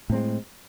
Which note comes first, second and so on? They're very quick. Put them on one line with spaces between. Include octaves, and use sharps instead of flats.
A2 C4 G#3